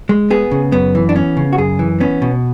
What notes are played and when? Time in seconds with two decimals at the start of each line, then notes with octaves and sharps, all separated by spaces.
0.09 G#3
0.30 B3 G#4
0.52 C#3
0.72 F#2 B3
0.95 E3
1.09 D4
1.15 B3 C#4
1.37 C#3
1.53 F#4
1.58 F#2 G#4
1.79 E3
2.00 B3 C#4
2.22 B2